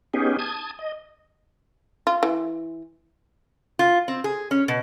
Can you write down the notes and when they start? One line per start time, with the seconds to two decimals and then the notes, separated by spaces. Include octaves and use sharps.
0.14 B3 C#4 D#4 G4 G#4
0.39 A5 D#6 G#6
0.79 D#5
2.07 F4
2.23 E3
3.79 F4
4.08 C4
4.24 G#4
4.51 C#4
4.68 B2